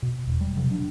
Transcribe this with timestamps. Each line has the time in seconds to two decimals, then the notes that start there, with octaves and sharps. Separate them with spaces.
0.02 B2
0.27 E1
0.41 G3
0.57 C3 F3
0.69 F#3 D4